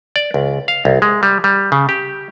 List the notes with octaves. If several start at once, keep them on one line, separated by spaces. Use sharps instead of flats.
D5
C#2
F5
C2
G#3
G3
G3
C#3
G4